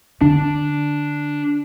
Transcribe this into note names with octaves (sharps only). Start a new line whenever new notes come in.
D3 D4